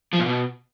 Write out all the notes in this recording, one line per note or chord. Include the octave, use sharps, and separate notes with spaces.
F3
A#2
B2